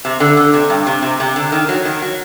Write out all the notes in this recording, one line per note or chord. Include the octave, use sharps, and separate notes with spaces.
C3
D3
D3
C3
G2
C3
C3
C3
D3
D#3
F#3
D#3
F#3